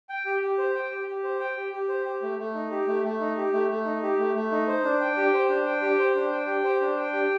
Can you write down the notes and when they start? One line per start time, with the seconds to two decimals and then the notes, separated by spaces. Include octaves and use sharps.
0.09 G5
0.26 G4
0.42 G4
0.58 C5
0.75 G5
0.91 G4
1.07 G4
1.24 C5
1.40 G5
1.56 G4
1.72 G4
1.89 C5
2.06 G4
2.22 A3
2.39 A3
2.55 D#4
2.71 G4
2.87 A3
3.04 A3
3.20 D#4
3.37 G4
3.53 A3
3.69 A3
3.85 D#4
4.03 G4
4.19 A3
4.35 A3
4.51 D#4
4.67 C5
4.84 D4
5.01 G5
5.17 G4
5.34 C5
5.49 D4
5.66 G5
5.82 G4
5.99 C5
6.15 D4
6.31 G5
6.47 G4
6.64 C5
6.81 D4
6.97 G5
7.13 G4